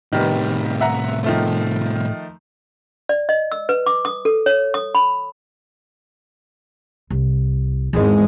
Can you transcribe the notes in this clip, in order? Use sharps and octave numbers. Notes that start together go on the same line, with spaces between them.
A2 C3 D#3 G3 B3
E5 F#5 A#5
D#3 F3 A3
D5
D#5
E6
B4
D6
D#6
A4
C#5
D#6
B5
C2
G#1 E2 E3 G#3